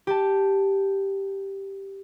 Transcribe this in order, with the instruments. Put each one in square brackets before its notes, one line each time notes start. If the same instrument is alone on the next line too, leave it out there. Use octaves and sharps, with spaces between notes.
[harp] G4 A5